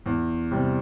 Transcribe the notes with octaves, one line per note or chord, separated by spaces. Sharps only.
E2
C3 G3 C4